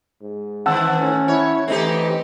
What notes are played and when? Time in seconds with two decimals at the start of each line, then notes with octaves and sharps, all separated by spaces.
0.22 G#2
0.66 D#3 E3 C4 F#5 A5 E6
0.99 A2 C#4
1.28 E4 C#5
1.68 E3 A3 C4 D#4 G4